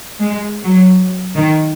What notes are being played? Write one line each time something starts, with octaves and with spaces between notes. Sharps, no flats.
G#3
F#3
D#3